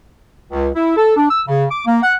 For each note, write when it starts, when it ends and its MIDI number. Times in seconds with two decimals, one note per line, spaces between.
0.51 0.69 37
0.75 0.94 64
0.97 1.16 69
1.17 1.28 62
1.31 1.42 88
1.48 1.65 49
1.71 1.85 86
1.86 1.99 58
2.03 2.15 78